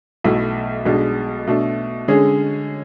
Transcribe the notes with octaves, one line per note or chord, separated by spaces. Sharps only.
B1 B2 A3 E4
B1 B2 G#3 D4
B2 A3 D4
D3 G#3 C#4 G#4